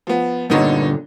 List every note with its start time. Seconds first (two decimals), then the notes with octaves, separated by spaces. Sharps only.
0.07 F3 B3
0.50 G2 A#2 D3 B3 D#4 C#5